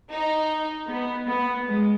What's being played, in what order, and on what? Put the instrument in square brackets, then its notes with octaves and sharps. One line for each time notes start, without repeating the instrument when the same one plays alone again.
[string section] D#4
B3
B3
G#3